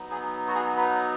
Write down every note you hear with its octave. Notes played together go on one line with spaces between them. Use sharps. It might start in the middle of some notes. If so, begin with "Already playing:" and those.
Already playing: F#3 B3 D#4
G#4
F#4
G#4
B4